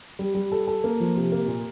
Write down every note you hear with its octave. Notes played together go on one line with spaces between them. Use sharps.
G3
G3
A4
A4
A#3
F3
C3
A#3
A#2